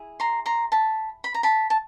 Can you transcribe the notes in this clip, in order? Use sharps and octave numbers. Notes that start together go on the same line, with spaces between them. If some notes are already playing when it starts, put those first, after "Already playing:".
Already playing: E4 G#4
A#5 C6
A#5 C6
A5 B5
B5
A#5
A5 B5
A5